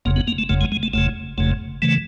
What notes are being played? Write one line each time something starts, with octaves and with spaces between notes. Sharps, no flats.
F#1 F2 C#3 A#3
B3
A#3
A3
F#1 F2 C#3 A3
G#3
G#3
A3
F#1 F2 C#3 A3
F#1 F2 C#3 A3
C#3 E3 A3